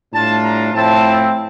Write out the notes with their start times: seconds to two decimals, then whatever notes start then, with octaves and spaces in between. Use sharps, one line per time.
0.13 A2 G3 D4 F4 A5
0.44 A#5
0.73 A2 F3 C4 E4 A5